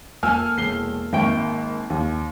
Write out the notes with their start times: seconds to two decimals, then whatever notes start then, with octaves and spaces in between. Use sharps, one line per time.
0.23 A#3 A4 G#5 E6 F6
0.57 E1 C7 G7
1.13 G#1 A#3 E5 G5 C#6
1.90 D#2